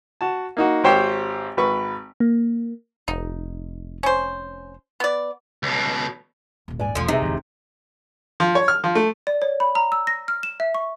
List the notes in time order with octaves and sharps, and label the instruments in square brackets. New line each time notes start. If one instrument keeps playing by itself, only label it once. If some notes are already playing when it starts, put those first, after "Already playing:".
[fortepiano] F#4 A5
A#3 D#4 F#4
G#1 G4 C5 C#5 G5 C6
G#1 B4 C#6
[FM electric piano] A#3
[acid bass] F1 [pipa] D#4
[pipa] C#4 C5
B3 D5
[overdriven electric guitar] C#2 B2
[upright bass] D#1 A#1
[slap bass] G#2 [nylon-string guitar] D5 G#5
[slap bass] B1 E2 A3 [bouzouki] D3 F3
[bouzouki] C3 [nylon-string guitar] D#4 G#4 E5
[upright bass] D#1 G#3 [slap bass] G#1 E2 D3
[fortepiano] F3
C#5
F6
F3
A3
[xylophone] D5
C#5
B5
A#5
E6
A#6
F6
E7
E5
C#6